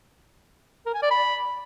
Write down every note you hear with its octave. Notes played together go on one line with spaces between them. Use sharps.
A#4
G#5
D5
B5